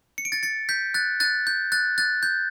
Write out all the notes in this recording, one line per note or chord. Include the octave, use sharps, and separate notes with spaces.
C#7
D7
A6 C#7
A6 C#7
G6 B6
F#6 A6
F#6 A6
G6
F#6 A6
F#6 A6
G6